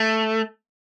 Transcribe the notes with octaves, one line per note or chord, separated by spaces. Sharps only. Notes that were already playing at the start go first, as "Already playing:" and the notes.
Already playing: A3